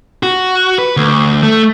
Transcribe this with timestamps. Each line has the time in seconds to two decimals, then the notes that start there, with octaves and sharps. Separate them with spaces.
0.23 F#4
0.79 B4
0.97 D2
1.43 A3